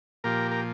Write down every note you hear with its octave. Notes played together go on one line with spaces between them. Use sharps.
A#2 F3 G4 A#4
A#4